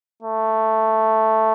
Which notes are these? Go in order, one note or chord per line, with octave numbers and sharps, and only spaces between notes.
A3